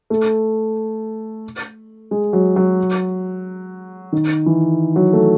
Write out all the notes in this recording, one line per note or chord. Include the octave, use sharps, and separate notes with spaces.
A3
G#3
F#3
F#3
D#3
E3
F#3
A3